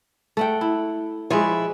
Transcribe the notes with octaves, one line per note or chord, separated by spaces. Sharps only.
A3 F#5 G5
E4
F3 G#3 E4 B4 C#5